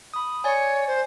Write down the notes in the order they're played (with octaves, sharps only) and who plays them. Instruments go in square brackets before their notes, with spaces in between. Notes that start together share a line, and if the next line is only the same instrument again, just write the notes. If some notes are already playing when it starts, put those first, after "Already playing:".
[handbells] B5 D#6
[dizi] C#5 [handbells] D5 G#5
[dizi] C5